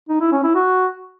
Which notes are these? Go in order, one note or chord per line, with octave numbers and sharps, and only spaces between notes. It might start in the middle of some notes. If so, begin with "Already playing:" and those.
D#4
E4
C#4
E4
F#4